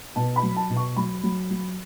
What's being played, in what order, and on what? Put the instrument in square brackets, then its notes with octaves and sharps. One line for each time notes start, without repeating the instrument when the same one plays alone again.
[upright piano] B2 A5
B5
F#3
A5
B2
C#6
F#3 B5
F#3
F#3